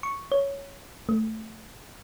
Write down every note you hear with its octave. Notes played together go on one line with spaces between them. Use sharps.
C#6
C#5
A3